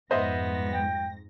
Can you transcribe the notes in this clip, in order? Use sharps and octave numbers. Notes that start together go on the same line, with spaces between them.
F2 G#2 B3 C5 D#5 E5 A#6
G5